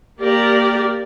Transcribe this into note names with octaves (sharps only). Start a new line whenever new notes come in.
A#3 G4 A#4 D5